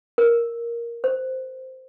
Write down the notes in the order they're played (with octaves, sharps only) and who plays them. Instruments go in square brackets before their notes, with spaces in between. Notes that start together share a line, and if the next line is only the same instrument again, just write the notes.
[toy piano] A#4
C5